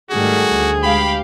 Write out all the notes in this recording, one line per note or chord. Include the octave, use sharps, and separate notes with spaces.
G#2 D#3 G3 A3 F#4 G#4
D2
G#3 G4 F5 B5